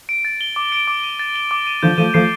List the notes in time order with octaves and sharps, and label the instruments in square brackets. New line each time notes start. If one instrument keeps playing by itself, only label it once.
[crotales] D7
A6
G7
D6
D7
D6
D#7
A6
G7
D6
D#7
[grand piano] D3 F3 [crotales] G6
[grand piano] F3 A3 [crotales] D#7
[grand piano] F3 A3 [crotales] C7